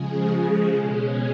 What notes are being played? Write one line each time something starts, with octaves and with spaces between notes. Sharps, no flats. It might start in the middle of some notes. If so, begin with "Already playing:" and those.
Already playing: C#3 F3 G#3 G#4
B2 G#3 C#4